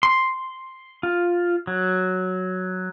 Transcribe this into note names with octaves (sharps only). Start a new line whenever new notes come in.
C6
F4
F#3